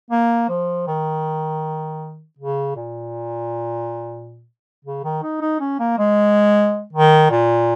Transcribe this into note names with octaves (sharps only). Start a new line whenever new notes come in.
A#3
F3
D#3
C#3
A#2
C#3
D#3
D#4
D#4
C#4
A#3
G#3
D#3
A#2